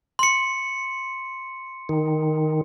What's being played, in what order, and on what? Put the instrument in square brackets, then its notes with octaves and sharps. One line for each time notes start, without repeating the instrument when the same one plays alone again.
[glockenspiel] C6 C#7
[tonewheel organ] D#3